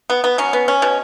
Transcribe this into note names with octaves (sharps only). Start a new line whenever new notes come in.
B3
B3
F#3 C#4
B3
C#4
B2